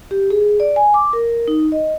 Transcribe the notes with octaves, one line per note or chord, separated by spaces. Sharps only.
G4
G#4
D5
G#5
D6
A#4
D#4
D#5